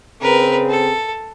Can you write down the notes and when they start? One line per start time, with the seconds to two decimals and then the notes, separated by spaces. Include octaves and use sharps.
0.22 C#3 C4 G#4 A#4 B4
0.70 A4